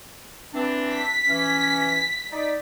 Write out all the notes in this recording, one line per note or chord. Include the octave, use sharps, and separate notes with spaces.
E3 C4 D4
B6
E3 C#4
D#4 D5